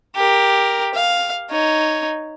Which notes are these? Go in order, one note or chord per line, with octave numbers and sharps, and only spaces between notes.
G4 A#4
F5
D#4 C#5